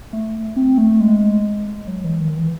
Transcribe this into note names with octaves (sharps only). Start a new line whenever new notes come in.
A3
C4
A3
G#3
F#3
E3
D#3
E3